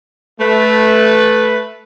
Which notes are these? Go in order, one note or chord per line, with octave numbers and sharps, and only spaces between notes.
A3 B4